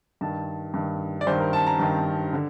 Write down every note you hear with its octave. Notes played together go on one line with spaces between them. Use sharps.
G2 D#3 A5
G2 D#3
D5
G2 D#3 C5
A#4
A5
A#5
G2 D#3 A5
D3